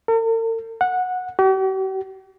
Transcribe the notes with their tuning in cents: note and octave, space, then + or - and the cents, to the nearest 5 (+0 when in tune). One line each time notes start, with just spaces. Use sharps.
A#4 -45
F#5 -15
G4 -45